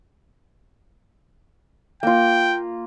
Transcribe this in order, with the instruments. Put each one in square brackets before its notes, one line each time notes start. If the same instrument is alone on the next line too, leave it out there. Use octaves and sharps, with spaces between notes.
[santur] A#3 F4 [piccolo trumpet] G5